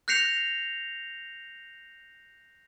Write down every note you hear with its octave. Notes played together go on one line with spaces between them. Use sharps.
F#6 G6 A#6 C7 C#7 F7